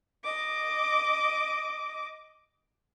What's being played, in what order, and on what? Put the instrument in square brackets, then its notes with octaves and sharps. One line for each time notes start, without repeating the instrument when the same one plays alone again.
[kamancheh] D#5 D6